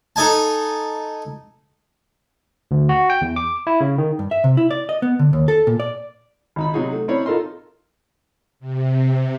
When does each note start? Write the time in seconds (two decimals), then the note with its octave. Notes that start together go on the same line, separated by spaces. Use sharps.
0.16 D#4 A4 D#5 G#5 A5
2.71 D2
2.89 F#4
3.10 G5
3.21 E2
3.36 D6
3.67 E4
3.81 C#3
3.98 D#3
4.19 G2
4.31 E5
4.44 C3
4.57 E4
4.71 D5
4.89 D#5
5.02 B3
5.19 D3
5.33 D#2
5.48 A4
5.67 A#2
5.80 D5
6.56 G#1 D#4 B5
6.74 C3 F#3 D#4 F#4 G#4
6.92 A3
7.08 C4 C#4 D#4 E4 C#5 D5
7.26 D#4 F4 A4 A#4 D#5 C6
8.60 C3